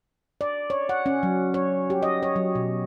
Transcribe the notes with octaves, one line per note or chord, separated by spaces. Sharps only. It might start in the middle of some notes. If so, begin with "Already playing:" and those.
D5
C#5
F#5
C#4
F#3
C#5
G4
D#5
C#5
F#3
B2